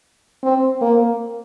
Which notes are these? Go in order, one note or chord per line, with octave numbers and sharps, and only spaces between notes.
C4
A#3